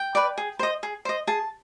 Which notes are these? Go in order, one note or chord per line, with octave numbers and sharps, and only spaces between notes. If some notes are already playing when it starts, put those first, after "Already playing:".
Already playing: G5
B4 D5
G#4
C5 D#5
G#4
C5 D#5
G#4 A5